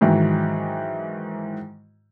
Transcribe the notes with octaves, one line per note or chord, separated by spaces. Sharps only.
G#2 D#3 E3 F#3